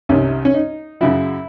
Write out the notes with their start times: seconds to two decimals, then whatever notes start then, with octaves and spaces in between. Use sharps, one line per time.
0.09 C2 C3 D#3 C#4
0.45 C#4
0.54 D#4
1.01 F#2 C#3 F#3 E4